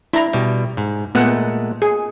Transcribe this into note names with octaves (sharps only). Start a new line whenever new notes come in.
D4 E4 A#5
B2 G3
G#2
A#2 G#3 A3 B3 F#5
G#4